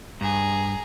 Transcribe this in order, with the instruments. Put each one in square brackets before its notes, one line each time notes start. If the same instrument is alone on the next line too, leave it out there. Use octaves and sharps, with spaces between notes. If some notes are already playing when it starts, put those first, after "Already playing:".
[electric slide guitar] G2 [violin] G#4 A#5